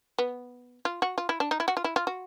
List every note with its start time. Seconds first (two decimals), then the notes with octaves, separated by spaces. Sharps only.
0.18 B3
0.85 F4
1.02 F#4
1.18 F4
1.29 E4
1.40 D4
1.51 D#4
1.60 E4
1.68 F#4
1.77 F4
1.84 E4
1.96 F4
2.07 F#4